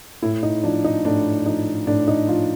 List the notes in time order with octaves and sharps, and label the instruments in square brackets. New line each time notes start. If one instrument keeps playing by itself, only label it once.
[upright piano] A2 E4
D#4
F3 D4
D#4
A2 D4
F3 D#4
A2 D4
D#4
F3 F4